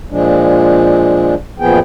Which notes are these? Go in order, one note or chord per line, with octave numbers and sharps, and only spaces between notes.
A#2 F3 G#3 D4
F#2 A#2 F3 B3 G#4 G5